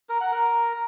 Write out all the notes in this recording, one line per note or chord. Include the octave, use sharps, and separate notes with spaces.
A#4
F#5
A#4